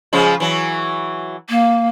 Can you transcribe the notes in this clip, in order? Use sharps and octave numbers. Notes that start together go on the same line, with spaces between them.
C#3 F3 G#3
E3 F#3
A#3